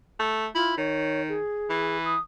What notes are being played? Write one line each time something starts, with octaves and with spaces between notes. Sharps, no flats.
A3
E4 F4
D#3 C#5
G#4
E3
D#6